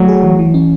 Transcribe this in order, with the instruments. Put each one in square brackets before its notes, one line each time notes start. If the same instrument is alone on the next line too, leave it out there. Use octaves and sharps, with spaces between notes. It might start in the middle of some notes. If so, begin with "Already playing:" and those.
Already playing: [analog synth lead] F#3 [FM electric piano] A3
[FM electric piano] G#4
E3
E3
C#4